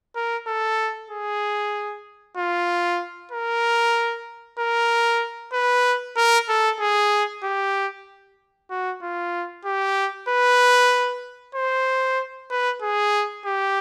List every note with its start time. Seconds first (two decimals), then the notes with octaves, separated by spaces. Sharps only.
0.15 A#4
0.47 A4
1.10 G#4
2.37 F4
3.32 A#4
4.59 A#4
5.53 B4
6.17 A#4
6.48 A4
6.80 G#4
7.43 G4
8.70 F#4
9.02 F4
9.65 G4
10.29 B4
11.55 C5
12.50 B4
12.82 G#4
13.45 G4